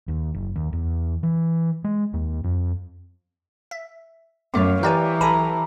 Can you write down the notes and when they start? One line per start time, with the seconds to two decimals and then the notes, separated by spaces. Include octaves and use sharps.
0.08 D#2
0.35 F#1
0.56 D#2
0.73 E2
1.23 E3
1.84 G#3
2.13 D#2
2.44 F2
3.71 E5
4.54 F#2 A3 B3 C#5 F5 D6
4.83 E3 G4 A#4 B4 D5 G#5
5.21 B1 A4 G#5 A#5 B5